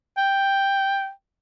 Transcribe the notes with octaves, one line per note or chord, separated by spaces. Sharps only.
G5